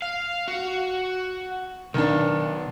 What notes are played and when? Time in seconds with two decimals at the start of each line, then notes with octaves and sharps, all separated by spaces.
0.02 F5
0.48 F#4
1.94 B1 D#3 D4